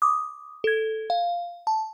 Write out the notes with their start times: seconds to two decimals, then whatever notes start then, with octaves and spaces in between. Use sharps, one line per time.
0.02 D6 D#6
0.64 A4 G#6
1.10 F5
1.67 A5